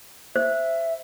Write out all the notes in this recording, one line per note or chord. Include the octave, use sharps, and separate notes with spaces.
C5 E5